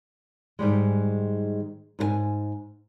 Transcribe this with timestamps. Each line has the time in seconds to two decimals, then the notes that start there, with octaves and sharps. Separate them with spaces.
0.59 G#2 D#3 G3 G#3
1.99 G#2 G#4 G#5